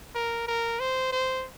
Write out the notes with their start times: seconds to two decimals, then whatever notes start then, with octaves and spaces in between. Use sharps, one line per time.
0.15 A#4
0.47 A#4
0.80 C5
1.12 C5